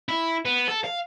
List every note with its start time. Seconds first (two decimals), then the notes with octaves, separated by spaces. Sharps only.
0.09 E4
0.45 B3
0.68 A4
0.84 F5